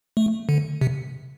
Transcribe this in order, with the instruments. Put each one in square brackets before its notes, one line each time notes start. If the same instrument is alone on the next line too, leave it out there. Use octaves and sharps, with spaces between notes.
[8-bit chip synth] A3
D3
C3